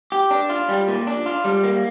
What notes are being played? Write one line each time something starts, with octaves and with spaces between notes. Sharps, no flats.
G4
D4
F4
G3
A#2
D4
F4
G3
A#3